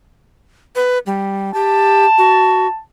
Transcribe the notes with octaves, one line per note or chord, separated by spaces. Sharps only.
B4
G3
G4 A5
F#4